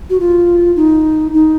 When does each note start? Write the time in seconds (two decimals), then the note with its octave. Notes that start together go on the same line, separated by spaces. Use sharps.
0.10 F#4
0.20 F4
0.76 D#4
1.34 D#4